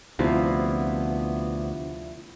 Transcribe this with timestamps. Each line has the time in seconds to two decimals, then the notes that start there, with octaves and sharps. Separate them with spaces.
0.19 D2 C3 F3 B3 E4 F4